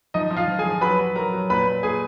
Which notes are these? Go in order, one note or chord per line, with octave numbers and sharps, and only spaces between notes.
F3 D#4 D#5
F3
F4 F5
F3
G#4 G#5
F3
F#3 B4 B5
F#3
F#3 A#4 A#5
F#3
A#2 B4 B5
A#2
A#2 G#4 G#5